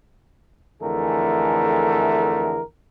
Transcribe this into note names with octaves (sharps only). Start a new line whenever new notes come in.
F2 D3 E3 A3 G#4 A#4